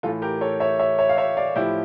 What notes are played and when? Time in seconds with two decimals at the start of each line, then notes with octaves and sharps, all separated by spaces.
0.03 A2 E3 F4 A4
0.22 G4 A#4
0.41 A4 C#5
0.60 C#5 E5
0.79 C#5 E5
0.99 C#5 E5
1.09 F5
1.17 C#5 E5
1.37 D5 F5
1.56 A2 F3 E4 G4